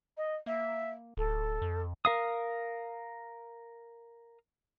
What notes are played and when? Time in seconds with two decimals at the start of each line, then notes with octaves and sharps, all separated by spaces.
0.17 D#5
0.46 A#3 E5
1.17 D1 A4
1.62 F2
2.05 A#4 F5 D#6